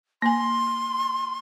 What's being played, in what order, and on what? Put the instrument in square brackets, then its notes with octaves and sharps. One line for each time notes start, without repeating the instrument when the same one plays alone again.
[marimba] A#3 G#5 [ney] C6